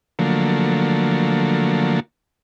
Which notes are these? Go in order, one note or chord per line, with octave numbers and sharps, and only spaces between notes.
D3 F3 F#3 A3 A#3